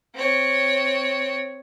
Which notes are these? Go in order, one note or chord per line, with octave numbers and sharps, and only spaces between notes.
C4 C#5